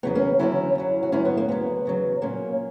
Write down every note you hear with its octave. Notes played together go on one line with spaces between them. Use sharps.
E2 C#3 F#3 B3
A#3 C#4
E2 D3 F#3 C#4 E4
F#2 C#3 F#3
F#4
G2 D3 F#3 C#4 E4
B3
A#3
D2 C#3 F#3 B3
E2 C#3 F#3
A#2 F#3 A#3 C#4